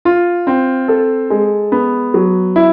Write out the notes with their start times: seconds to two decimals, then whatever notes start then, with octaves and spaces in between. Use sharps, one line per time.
0.05 F4
0.47 C4
0.88 A4
1.30 G#3
1.72 B3
2.14 F#3
2.56 E4